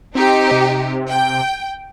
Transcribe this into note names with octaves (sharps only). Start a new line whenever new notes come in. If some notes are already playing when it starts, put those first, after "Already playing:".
C4 D#4 G4
C3
G5